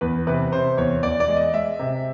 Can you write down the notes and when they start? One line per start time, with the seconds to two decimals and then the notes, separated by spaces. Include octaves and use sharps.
0.01 E2 B4
0.27 C3 B4
0.52 C3 C5
0.77 E2 C#5
1.03 E2 D5
1.20 D5
1.28 G#3
1.37 D#5
1.53 G#3 E5
1.80 C3